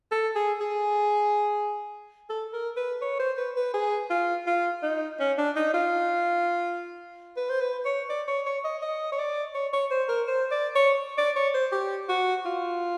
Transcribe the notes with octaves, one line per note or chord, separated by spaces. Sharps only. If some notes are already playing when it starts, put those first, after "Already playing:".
A4
G#4
G#4
A4
A#4
B4
C#5
C5
B4
B4
G#4
F4
F4
D#4
C#4
D4
D#4
F4
B4
C5
B4
C#5
D5
C#5
C#5
D#5
D#5
C#5
D5
C#5
C#5
C5
A#4
C5
D5
C#5
D5
C#5
C5
G4
F#4
F4